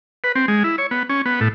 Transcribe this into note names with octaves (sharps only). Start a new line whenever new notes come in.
B4
C4
G#3
E4
C#5
B3
C#4
B3
A2